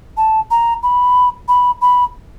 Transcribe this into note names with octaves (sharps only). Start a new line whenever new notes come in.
A5
A#5
B5
B5
B5